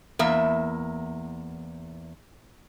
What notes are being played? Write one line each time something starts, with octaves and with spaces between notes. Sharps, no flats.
E2 A#3 E5